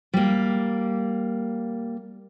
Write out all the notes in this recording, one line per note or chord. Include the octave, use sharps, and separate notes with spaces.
G3 A#3